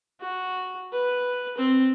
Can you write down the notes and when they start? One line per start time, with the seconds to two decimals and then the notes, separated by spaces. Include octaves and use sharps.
0.21 F#4
0.92 B4
1.58 C4